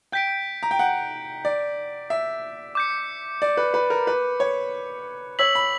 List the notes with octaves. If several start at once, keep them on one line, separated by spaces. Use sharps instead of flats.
G5 G6 B6 D7
A#5
G5
F#5
D5
E5
D6 G6 C#7
D5
B4
B4
A#4
B4
C#5
C#5 E6 B6 F#7
B5